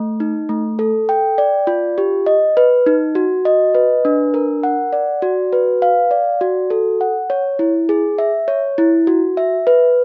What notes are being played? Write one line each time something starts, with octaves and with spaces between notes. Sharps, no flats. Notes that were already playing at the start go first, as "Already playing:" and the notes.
Already playing: A3
D#4
A3
A4
G5
D5
F4
G4
D#5
B4
D#4
F#4
D#5
B4
D4
A#4
F#5
D5
F#4
B4
F5
D5
F#4
A4
F#5
C#5
E4
G#4
E5
C#5
E4
F#4
E5
B4